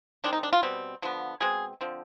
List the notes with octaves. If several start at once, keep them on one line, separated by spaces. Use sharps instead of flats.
D#3 G#3 C4 D4
D#4
D4
F4
B2 G3 C4
D3 F3 B3
B2 G#3 C4 G#4
D3 F3 C4